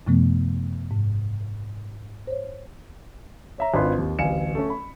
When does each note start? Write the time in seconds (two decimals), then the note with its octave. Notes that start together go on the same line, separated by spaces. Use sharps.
0.07 F#2 C3 F3 A3 B3
0.91 G#2
2.27 C5 C#5
3.58 C#5 E5 A#5
3.74 G#1 D4 F4 B4 C6
3.98 D#2
4.19 D1 A1 F5 G#5 C#7 E7
4.55 A3 C#4
4.70 B5